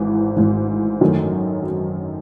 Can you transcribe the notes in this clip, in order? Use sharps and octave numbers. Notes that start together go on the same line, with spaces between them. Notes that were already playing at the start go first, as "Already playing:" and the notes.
Already playing: G#1 G#2 E3
G#1 G#2 E3
F#2 D#3 F#3 A3